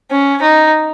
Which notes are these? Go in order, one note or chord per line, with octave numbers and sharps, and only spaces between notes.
C#4
D#4